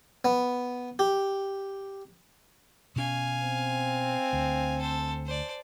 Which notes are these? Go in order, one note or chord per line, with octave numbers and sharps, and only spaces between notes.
B3
G4
B2 C#4 F5 G#5
C4
D2
A4 C5
C5 D5